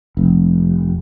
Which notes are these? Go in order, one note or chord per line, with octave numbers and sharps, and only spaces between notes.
F1